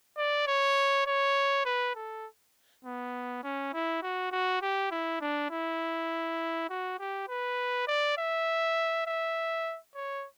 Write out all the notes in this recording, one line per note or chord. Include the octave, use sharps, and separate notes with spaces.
D5
C#5
C#5
B4
A4
B3
C#4
E4
F#4
F#4
G4
E4
D4
E4
F#4
G4
B4
D5
E5
E5
C#5